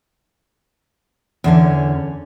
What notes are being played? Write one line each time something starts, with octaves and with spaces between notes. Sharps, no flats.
E2 D3 C#4